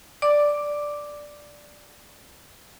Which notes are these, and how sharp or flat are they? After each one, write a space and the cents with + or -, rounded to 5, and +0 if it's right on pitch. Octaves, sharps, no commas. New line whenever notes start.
D5 +0 D6 +0